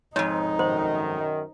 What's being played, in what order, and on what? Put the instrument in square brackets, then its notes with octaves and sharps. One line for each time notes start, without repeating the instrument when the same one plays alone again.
[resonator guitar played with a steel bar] F2 G#2 [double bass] D#4 [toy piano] C#5
[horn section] F#2 D#3 [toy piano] C5